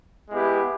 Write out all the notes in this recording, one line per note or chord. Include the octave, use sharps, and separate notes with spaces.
G#3 B3 E4 G4 B4